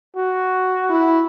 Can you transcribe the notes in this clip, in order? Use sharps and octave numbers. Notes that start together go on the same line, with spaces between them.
F#4
E4